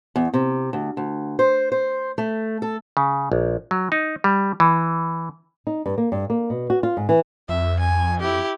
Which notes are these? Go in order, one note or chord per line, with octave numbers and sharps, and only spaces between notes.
E2
C3
D2
D2
C5
C5
A3
A4
C#3
A#1
F#3
D#4
G3
E3
D#4
G2
A#3
G2
A#3
B2
F#4
F4
G#2
E3
F2 E5
G#5
E4 G4